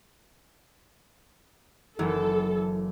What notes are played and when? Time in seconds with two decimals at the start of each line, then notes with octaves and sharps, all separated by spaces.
1.99 F#1 E3 F#3 A4